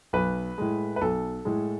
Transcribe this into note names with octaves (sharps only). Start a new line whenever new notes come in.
B1 B4
A2 G#3
B4
B1 A4
A2 G#3